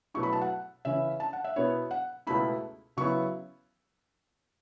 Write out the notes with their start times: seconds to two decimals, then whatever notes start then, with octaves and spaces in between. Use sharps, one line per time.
0.14 B2 F#3 A3 E4 C#6
0.23 B5
0.33 A5
0.41 F#5
0.85 C#3 E3 C#4 E4 E5
1.20 A5
1.33 F#5
1.44 E5
1.56 B2 B3 E4 C#5
1.91 F#5
2.27 C#2 B2 A3 E4 B5
2.97 C#3 F#3 B3 E4 C#6